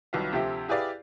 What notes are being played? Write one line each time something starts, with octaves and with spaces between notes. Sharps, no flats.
C2 D#3 F#3 F4 B4 F5
D2 C3 F3 G4 E5
E4 G4 G#4 B4 D5 F5